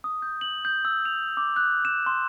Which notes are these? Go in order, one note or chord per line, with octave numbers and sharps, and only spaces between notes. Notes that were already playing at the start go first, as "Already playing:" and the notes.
D#6
G6
F#7
G6
E6
F7
D6
F#6
E7
C6